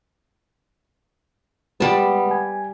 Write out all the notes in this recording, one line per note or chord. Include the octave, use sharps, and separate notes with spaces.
G3 G#3 B3 A5
G#5